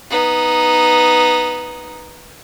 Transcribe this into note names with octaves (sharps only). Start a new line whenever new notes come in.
B3 D#4